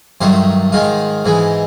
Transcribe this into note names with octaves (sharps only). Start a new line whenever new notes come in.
G2 D#3 F#3 A3 C5
G#2 D#3 G#3 F4
G#2 E3 G#3